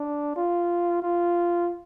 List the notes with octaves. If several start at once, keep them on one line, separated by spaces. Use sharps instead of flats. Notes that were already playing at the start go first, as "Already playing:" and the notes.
Already playing: D4
F4
F4